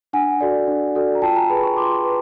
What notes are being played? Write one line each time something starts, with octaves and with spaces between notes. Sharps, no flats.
D4 F#5 G#5
F#4 A4 D5
D4
F#4 A4 D5
A#5
F4 G5 A5
G#5 A#5
G#4 B4 A5 B5
B5 C#6
F4 C6 D6
B4